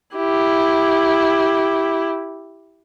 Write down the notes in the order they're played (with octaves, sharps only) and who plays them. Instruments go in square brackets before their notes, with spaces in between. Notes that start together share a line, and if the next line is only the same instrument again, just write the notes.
[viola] E4 G4